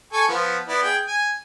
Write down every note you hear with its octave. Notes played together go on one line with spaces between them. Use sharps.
A4 G#5 C#6
F3 B3
B3 E4 D5
G#4 G5
G#5